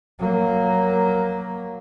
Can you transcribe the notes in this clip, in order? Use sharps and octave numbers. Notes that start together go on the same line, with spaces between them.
F#3 A#3